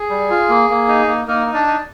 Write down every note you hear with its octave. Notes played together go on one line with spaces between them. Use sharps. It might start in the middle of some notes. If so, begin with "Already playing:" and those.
Already playing: G#4
G3
F4
A#3
A#3
D#4
A#3
A#3 D#4 A#4
D#4
D4 D5
D#4